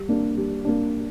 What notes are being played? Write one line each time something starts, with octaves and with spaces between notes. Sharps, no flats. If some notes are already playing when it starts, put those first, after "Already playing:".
Already playing: G3
A#3 D4
G3
A#3 D4